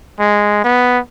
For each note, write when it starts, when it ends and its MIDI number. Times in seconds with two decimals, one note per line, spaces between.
0.19 0.64 56
0.64 0.99 59